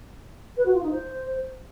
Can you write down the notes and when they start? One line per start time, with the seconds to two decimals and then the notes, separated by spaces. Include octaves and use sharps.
0.57 B4
0.66 F#4
0.74 F4
0.83 D#4
0.92 C5